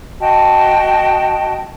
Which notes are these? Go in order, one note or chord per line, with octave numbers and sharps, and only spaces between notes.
F#4 D#5 G5 A5